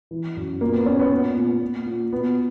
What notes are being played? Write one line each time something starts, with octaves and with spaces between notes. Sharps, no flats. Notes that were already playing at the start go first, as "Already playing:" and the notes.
E3
F#2
A#2 A#3
B3
A#2 C#4
B3
A#2 B3
A#2
A#2
A#2
B2 B3